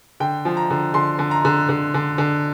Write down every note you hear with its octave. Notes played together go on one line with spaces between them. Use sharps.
D3 G5
F3
A#5
D3
D3 C6
D3
A#5
D3
D3
D3
D3